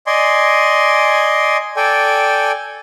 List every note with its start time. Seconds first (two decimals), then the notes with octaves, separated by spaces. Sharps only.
0.07 D5 D#5 G#5 C6
1.76 A4 D5 G5 G#5